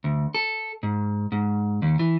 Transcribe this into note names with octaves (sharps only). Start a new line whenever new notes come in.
D2
A4
G#2
G#2
D#2
E3